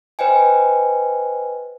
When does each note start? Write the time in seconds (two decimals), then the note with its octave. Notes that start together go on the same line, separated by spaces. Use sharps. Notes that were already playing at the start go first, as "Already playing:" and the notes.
0.19 B4 C5 D#5 G5 G#5